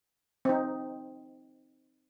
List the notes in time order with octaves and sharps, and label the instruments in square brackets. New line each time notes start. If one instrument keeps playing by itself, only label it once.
[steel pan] C4 D#4